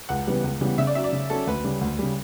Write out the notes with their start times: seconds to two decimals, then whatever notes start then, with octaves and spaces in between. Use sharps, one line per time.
0.09 C#2 F#5
0.27 C#3 E3 G3 B3
0.44 C#2
0.61 C#3 E3 G3 B3
0.78 C#3 E5
0.87 D5
0.95 F#3 C#4 E5
1.04 D5
1.13 C#3
1.30 F#3 C#4 A4
1.47 D2 B4
1.64 C#3 G3
1.81 D2
1.99 C#3 G3